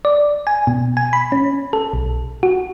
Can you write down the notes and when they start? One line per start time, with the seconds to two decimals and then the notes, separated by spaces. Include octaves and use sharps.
0.05 D5
0.47 G#5
0.67 B2
0.97 G#5
1.13 B5
1.32 C#4
1.73 A4
1.93 B1
2.43 F#4